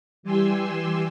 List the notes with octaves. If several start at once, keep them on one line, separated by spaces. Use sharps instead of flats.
E3 G3 G4 G#5 C6 E6